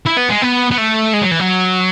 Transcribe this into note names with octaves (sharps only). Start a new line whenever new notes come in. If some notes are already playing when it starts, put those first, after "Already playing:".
E4
B3
G#3
B3
B3
A3
G#3
F#3
E3
F#3